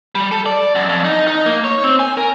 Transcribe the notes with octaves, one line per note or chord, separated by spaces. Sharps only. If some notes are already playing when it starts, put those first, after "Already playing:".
G3
A4
D5
F#2
F2
D#4
D#4
A#3
C#5
C4
G#5
A#4